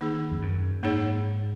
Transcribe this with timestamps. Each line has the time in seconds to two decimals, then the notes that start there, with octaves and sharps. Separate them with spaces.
0.01 D#3 A#3 D#4 G#4
0.31 F2
0.42 F#2
0.83 G#2 A#3 D#4 G#4 C#5